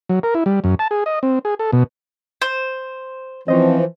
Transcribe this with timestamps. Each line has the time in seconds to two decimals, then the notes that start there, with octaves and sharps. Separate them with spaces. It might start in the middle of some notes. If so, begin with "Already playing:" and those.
0.09 F#3
0.23 A#4
0.35 E4
0.46 G3
0.64 F#2
0.79 A5
0.91 G#4
1.06 D#5
1.23 C4
1.45 G#4
1.59 A4
1.73 B2
2.42 C5
3.48 E3 F3 C4 C#4 C5 D#5